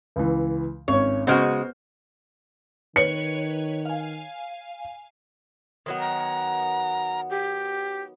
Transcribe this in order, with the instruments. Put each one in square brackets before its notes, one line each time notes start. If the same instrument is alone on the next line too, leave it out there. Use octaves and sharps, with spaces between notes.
[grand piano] C#2 E3
[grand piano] G#1 C#4 [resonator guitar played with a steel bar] C#5
[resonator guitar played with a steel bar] C#3 G#3 F#4 [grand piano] B3 C5 F6
[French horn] D#3 [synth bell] B4 C#5 [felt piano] C#7
[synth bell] F5 G#5
[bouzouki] D#3 F#3 B3
[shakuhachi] A#5
G4